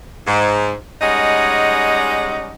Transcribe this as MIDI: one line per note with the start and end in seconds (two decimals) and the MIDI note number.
0.27 0.75 44
1.01 2.54 55
1.01 2.54 56
1.01 2.54 61
1.01 2.54 63
1.01 2.54 75
1.01 2.54 78